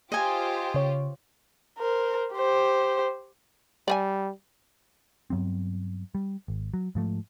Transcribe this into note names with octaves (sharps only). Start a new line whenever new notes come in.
F4 G4 C5 D#5 G#5
C#3 C#5
A#4 C5
G4 C5
G3 D5 D#5 G#5
G2 F#3 B3 C4
G3
G#1
F#3
G#2 F3 A3